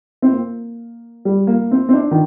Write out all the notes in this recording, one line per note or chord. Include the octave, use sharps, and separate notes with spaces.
C4
A#3
G3
A#3
C4
C4
D4
D#3